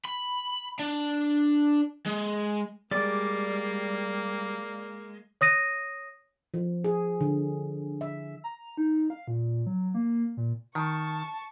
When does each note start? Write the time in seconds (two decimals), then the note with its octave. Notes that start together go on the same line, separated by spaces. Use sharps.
0.05 B5
0.79 D4
2.06 G#3
2.91 G3 G#3 A#3 D5
5.41 C#5 D#6 A#6 D#7
6.54 F3
6.84 G#4
7.21 D3
8.01 E5
8.44 A#5
8.77 D#4
9.10 F5
9.28 A#2
9.67 F#3
9.94 A#3
10.37 A#2
10.75 D#3 A5 C#6